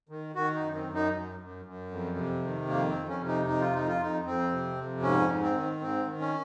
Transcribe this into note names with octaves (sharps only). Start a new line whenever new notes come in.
D#3
D#3 F#4
D#4
F#2
C4
F#2
D#4
F#2
F#2
F#2
F2
C3
D#3
F2 A#3
C4
F2
C#4
C3
D#4
F2 D#4
F4
F2 D#4
F4
F2 D#4
F2 C4
C3
F2
G#2 C#4
G#2
C4
D#3
G#2 C4
D#3
C#4